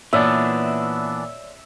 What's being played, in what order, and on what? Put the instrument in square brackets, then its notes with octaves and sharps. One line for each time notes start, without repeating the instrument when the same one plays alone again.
[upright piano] A#2 [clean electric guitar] E3 B3 D4 [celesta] C#5 D5 E6 [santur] E5